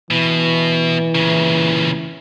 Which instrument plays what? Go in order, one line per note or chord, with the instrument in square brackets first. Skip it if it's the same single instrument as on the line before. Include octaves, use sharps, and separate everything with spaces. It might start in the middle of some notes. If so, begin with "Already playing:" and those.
[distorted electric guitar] B2 [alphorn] E3
[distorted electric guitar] A#2 C#3